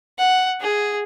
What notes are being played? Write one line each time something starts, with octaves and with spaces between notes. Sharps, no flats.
F#5
G#4